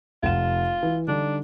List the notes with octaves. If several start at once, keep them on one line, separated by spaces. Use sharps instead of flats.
F1 F4 F#5 E7
E3
D3 G3 D4 D#4